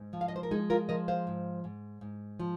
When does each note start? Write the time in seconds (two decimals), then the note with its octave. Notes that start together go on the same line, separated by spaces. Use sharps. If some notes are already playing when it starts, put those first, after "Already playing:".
Already playing: G#2
0.13 F3
0.21 F5
0.28 D#5
0.36 C5
0.43 A#4
0.51 G#3 D#4 G#4
0.70 F4 A#4
0.89 F3 A#4 D#5
1.08 C5 F5
1.27 G#2
1.64 G#2
2.01 G#2
2.40 F3